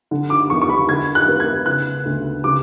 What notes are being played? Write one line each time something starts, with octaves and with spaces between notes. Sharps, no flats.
D3
D6
E2 C#6
C#6
B5
D3 G#6
F#6
B3
G#6
C#3 F#6
D2
C#3 D6